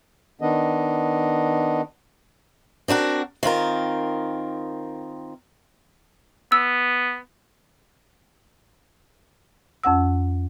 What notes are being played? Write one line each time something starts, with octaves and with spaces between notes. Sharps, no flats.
D#3 B3 D4 D#5
C4 D4 F#4 A#4
D#3 C4 F4 A#4
B3 E6
F2 C#4 F#5 E6